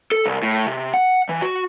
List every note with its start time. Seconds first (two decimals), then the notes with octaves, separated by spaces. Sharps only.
0.12 A4
0.26 C2
0.43 A2
0.67 C3
0.94 F#5
1.29 E3
1.42 F#4